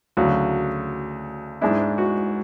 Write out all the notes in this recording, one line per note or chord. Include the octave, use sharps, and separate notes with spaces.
D2 C#3 F#3 F#4
G#2 G#3 D4 E4
F#4